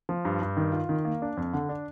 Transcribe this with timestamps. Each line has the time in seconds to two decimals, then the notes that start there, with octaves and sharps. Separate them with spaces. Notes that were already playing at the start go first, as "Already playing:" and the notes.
0.09 F3
0.25 G2
0.41 G2
0.57 D#3
0.72 F4
0.89 D#3
1.05 A#3
1.22 D4
1.37 F2
1.53 D3
1.69 D4